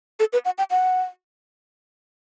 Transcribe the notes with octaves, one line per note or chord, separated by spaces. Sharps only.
A4
B4
F#5
G5
F#5